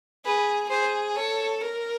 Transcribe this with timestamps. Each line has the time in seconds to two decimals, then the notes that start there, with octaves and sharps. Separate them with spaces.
0.25 G#4 B4
0.70 G#4 C5
1.16 A4 C#5
1.62 A#4